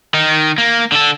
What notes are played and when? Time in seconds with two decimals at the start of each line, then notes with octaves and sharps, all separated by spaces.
0.14 D#3 D#4
0.58 A#3
0.92 D3 A4